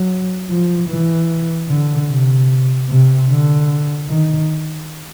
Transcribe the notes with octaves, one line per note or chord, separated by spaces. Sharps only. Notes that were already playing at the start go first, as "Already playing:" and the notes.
Already playing: F#3
F3
E3
D3
C3
C3
D3
D#3